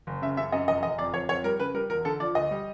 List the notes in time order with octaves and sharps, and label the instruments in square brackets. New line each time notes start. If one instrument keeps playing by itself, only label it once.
[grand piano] F#1
C#3 E5
F#2 E5
F#2 D#5
F1 D#5
F1 D#5
F2 D5
F2 C#5
F2 C#5
G3 A#4
C#3 B4
G3 A#4
E1 A#4
D3 A4
F3 D5
D2 D#5
G3